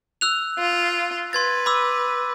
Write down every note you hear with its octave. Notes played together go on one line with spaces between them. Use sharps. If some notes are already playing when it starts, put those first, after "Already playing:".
E6 F#6 F7
F4
B4 C6 G#6 A6
B5 D6 E6